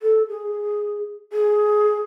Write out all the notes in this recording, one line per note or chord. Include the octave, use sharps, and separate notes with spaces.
A4
G#4
G#4